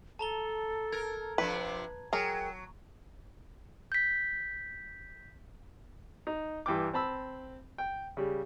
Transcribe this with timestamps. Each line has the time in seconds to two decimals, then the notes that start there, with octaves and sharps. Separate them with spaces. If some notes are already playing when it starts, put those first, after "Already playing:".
0.19 A4 A5 A#5 G7
0.92 A#4 G#6
1.38 C3 F3 D4 B4
2.13 F#3 G#4 A#4 G5
3.92 G6 B6
6.27 D#4
6.66 G2 E3 G5 D6
6.93 C4 A5 B5 E6
7.78 G5
8.17 C#3 G3